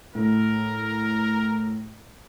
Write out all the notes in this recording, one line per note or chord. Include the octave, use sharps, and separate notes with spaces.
A2 A#4